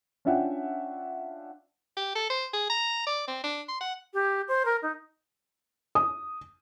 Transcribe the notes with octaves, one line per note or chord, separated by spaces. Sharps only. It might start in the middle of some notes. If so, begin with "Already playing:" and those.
C#4 D4 F4 E5 F#5 G5
G4
A4
C5
G#4
A#5
D5
C4
D4
C6
F#5
G4
C5
A#4
D#4
D#6